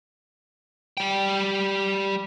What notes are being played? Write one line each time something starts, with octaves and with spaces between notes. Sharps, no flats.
G3 G5